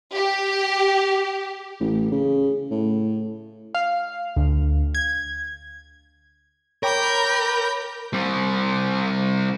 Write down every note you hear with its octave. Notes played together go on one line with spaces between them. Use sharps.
G4
A1
C#3
A2
F5
D2
G#6
A#4 C#5 G5 B5 D6 G6
G3 C4